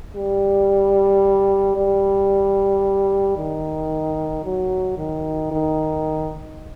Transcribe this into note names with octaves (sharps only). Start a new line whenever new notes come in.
G3
G3
D#3
F#3
D#3
D#3